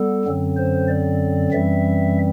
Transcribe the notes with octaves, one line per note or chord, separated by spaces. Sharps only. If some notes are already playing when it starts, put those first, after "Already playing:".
Already playing: G3 B3 A4
F#2 D3 F#3 C4
C5
D5
F#2 E3 G3 C4 E5